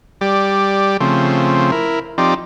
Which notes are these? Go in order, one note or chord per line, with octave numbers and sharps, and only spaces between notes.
G3 G4 D5
C#3 F3 A3 C4
E4 A#4
F3 C4 D#4 G4 D5